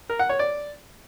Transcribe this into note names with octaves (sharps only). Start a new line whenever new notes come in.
A#4
F#5
C#5
D5